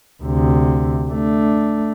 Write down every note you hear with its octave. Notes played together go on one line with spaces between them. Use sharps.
D2 C3
A3 D4